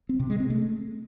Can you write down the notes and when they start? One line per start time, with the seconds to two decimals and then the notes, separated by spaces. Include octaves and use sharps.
0.09 C4
0.19 C3
0.30 G#3
0.40 C4
0.50 A3